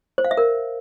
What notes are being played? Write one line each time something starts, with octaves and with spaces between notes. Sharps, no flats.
C5
F5
E5
A#4